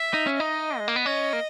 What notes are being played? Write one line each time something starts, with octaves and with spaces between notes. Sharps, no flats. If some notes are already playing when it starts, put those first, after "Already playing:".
Already playing: E5
D#4
C#4
D#4 D#5
G#3
A#3
B3
C#4 D#5
A#3